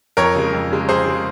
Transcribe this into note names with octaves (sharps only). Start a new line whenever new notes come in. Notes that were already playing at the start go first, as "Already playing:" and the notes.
F2 A#4 C#5
C#3 G#3
F2
C#3 G#3
F2 G#4 C5
C#3 G#3